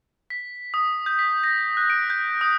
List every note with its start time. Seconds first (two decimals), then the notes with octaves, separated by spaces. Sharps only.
0.30 B6
0.74 D#6
1.06 G6
1.19 B6
1.44 A#6
1.77 F#6
1.90 D7
2.10 G6
2.41 D#6